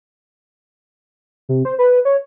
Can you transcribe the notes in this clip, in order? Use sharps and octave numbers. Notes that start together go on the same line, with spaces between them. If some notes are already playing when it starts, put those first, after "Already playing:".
C3
C5
B4
C#5